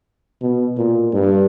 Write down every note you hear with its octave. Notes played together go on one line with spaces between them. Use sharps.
B2
A#2
G2